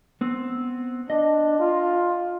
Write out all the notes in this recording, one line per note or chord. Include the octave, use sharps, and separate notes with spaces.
B3 C4
D4 D#5
F4